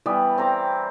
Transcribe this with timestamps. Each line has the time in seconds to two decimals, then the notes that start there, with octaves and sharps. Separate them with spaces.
0.06 E3 G3 B3 D5
0.38 C4 A#5 D6